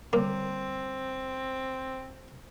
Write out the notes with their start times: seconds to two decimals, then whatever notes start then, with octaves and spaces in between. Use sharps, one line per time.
0.13 D3 G3 A#3 C4